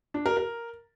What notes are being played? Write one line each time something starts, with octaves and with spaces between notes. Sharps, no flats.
D4
A#4
A#4